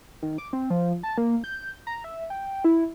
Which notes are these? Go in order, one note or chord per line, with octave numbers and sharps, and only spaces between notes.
D#3
D6
C4
F3
A5
A#3
G6
A#5
E5
G5
E4